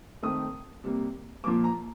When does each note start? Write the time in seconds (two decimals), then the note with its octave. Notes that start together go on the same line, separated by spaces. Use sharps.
0.23 D#3 A3 C4 D#6
0.84 C3 G3 A#3
1.44 A#2 F3 A#3 D6
1.64 A#5